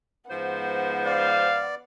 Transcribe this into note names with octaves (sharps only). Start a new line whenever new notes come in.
G#2 F3 B3 C5 F#5
D5 F5